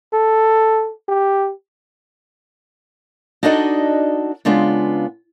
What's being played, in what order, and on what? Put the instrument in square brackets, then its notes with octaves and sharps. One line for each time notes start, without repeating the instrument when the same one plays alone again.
[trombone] A4
G4
[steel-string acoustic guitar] D4 D#4 F#4 A4 D5 D#5
C#3 G#3 B3 D4 F4